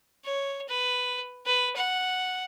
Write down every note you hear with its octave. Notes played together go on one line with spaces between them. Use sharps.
C#5
B4
B4
F#5